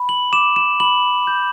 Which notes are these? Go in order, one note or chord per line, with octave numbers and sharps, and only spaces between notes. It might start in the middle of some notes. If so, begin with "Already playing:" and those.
Already playing: B5
F#7
D6 E7
E7
B5 F#7
G6